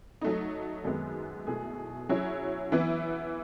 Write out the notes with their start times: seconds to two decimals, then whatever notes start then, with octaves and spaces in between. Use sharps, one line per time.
0.21 F#3 A3 D#4
0.85 F#2 D#3 G#3 B3
1.47 B2 A3 E4 G#4
2.09 F#3 C#4 E4 G#4 C#5
2.72 E3 B3 E4 B4